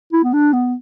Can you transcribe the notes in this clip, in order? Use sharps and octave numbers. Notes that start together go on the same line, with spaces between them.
E4
B3
D4
B3